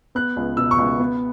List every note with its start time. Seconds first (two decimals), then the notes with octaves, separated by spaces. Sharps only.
0.15 B3 F#6
0.37 C#2
0.57 B2 E6
0.71 C#6
0.78 C#2
0.99 B3